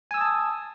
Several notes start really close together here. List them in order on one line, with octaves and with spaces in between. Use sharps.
G#5 E6 D#6 A5